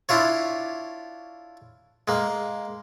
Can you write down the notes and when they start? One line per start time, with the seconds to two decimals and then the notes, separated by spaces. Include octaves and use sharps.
0.09 D4 E4 F4 C#5
2.08 G#3 A#3